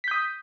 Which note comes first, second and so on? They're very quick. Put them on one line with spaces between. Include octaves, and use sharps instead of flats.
B6 G6 D#6